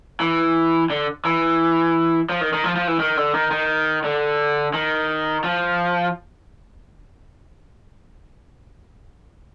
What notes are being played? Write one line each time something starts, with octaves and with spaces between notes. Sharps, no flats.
E3
D3
E3
F3
D#3
D#3
F3
F3
E3
D#3
D3
D#3
D#3
D3
D#3
F3